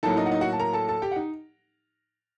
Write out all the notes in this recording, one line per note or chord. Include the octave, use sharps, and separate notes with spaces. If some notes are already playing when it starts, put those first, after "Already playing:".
A2 F#3 A#3 D#4 A4 A5
D#4 D#5
F#5
D#4 D#5
F#4 F#5
A5
A#4 A#5
A4 A5
A4 A5
G4 G5
F#5
D#4